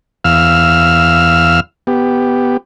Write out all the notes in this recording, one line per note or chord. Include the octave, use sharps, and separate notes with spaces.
E2 F5 E6 F6
B3 G4